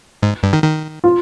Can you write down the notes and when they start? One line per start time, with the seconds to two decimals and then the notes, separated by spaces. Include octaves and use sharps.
0.22 G#2
0.43 G2
0.53 D#3
0.64 D#3
1.04 F4